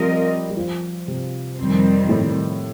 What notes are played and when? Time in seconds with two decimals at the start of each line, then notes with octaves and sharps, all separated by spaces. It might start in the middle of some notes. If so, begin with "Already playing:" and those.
Already playing: F3 G3 C4 F4 A#4 D#5
0.50 G3
0.57 F3
1.08 C3
1.58 F2 D#3 G3 C4
2.09 A2